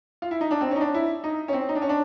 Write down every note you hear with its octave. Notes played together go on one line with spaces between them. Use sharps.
F4
E4
D#4
D4
C4
C#4
D#4
D4
E4
D#4
C#4
C4
D#4
D4
C#4
D4